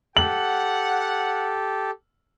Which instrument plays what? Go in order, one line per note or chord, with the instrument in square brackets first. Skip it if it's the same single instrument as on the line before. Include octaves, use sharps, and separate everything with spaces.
[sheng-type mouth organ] G4 A4 [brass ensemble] F#5 [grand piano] F#7